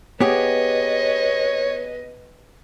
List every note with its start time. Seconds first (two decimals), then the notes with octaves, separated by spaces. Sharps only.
0.21 B3 G4 G#4 B4 C#5 D#5